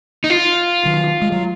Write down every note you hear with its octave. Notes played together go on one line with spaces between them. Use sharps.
D#4
F4
D#3 F#3
G#3
F#3